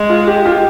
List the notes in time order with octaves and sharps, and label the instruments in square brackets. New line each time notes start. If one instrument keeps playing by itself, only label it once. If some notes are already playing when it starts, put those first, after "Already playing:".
Already playing: [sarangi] G#3
[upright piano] F4
G4
F4
G4